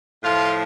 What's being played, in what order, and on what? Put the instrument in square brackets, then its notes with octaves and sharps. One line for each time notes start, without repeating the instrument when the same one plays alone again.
[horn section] A2 F3 A3 F4